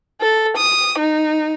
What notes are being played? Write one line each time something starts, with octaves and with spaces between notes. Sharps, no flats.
A4
D#6
D#4